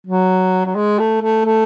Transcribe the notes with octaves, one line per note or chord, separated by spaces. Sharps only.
F#3
F#3
G#3
A3
A3
A3